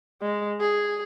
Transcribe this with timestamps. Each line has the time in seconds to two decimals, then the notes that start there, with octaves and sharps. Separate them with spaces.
0.22 G#3
0.60 G#4